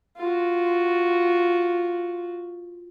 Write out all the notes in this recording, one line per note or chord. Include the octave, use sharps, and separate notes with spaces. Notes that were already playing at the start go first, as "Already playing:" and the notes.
F4 F#4